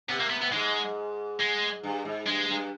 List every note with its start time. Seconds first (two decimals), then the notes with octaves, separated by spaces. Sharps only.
0.08 C3 B3
0.20 A#3
0.30 B3
0.42 B3
0.53 G#2 G#3
1.40 G#3
1.83 G2
2.05 G#2
2.26 G2 G#3
2.48 G2